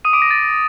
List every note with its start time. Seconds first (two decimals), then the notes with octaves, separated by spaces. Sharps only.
0.05 D#6 D#7
0.13 D6 D7
0.22 A#6
0.31 A6